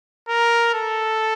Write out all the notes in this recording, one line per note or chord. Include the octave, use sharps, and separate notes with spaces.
A#4
A4